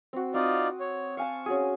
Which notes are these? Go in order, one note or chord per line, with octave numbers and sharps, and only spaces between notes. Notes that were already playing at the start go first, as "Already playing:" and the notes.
C4 F#4
C4 D#4 F4 D5 D#6
C#5
F5 G#5 A5 C#6
C#4 F#4 G#4